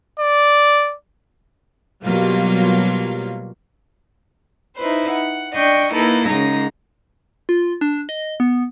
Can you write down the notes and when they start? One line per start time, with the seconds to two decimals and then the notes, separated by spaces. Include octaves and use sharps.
0.20 D5
2.04 B2 F#3 G3 A#3 F4
4.76 D#4 E4 B4 C5
5.11 F#5
5.55 D4 D#5 G5 C#6 G6
5.93 A#3 D#4 E4 A4 B4
6.27 F#2 C#3 G#3 D#4 A#6
7.49 F4
7.81 D4
8.09 D#5
8.40 B3